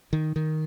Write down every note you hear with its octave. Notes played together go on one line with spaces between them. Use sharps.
D#3
D#3